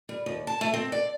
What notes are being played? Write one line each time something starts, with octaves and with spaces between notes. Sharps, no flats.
G3
D#2
A5
A3
C4
D5